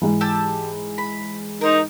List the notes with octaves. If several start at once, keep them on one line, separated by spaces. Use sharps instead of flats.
G#2 E3
G4 A5 E6
B5
D#4 A#4 C5